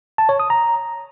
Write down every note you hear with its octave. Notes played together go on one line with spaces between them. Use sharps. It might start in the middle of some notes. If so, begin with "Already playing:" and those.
A5
C#5
D#6
A#5